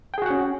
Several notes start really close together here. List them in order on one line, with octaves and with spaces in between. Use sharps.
G5 G#4 F#4 F#5 C#4